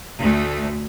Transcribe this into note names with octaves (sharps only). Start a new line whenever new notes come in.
D2 A3